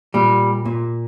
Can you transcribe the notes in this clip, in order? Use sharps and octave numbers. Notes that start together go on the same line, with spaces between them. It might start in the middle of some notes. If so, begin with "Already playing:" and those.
A#2 G3
A#2